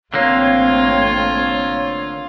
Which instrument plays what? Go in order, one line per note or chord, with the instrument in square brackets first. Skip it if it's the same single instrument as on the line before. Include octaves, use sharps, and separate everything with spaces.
[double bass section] A1 A3 C4 [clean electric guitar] D3 A#3 [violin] F4 [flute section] C#5